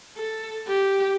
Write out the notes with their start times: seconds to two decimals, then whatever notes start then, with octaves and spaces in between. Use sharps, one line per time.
0.17 A4
0.68 G4